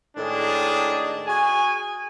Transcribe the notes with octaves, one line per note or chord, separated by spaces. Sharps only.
A2 D#3 G#3 D4 G#4
F#4 G#4 G#5